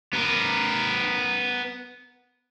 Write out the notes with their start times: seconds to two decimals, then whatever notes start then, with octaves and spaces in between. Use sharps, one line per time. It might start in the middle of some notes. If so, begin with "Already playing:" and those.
0.13 B3 A#4